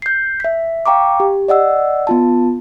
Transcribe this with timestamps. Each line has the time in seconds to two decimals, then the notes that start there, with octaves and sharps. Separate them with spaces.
0.02 G6 C7
0.40 E5 B6
0.86 F5 G5 A#5 C#6 D6
1.20 G4
1.48 D5 D#5 F#5 E6
2.07 B3 F4 A5